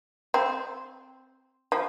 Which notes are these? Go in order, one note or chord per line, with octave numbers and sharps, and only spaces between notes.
C4
F3